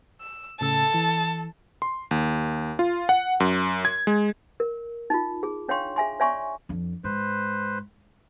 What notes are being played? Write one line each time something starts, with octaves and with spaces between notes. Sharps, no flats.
E6
A2 C#3 A4 A5 E6
E3
C6
D#2
F4
F#5
F#2
G#6
G#3
A#4
D#4 F4
G#4
D4 C#5 F5 G5 C6 C#6
G#4 E5 G#5 C6
C#5 D5 E5 G#5 C6 C#6
F2 D4
G#2 B4 C5